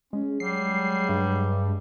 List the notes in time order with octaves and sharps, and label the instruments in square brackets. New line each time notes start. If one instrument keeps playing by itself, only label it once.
[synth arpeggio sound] G#3 [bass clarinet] C#4
[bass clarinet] F#3 [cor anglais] G3 [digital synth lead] C7
[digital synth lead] G2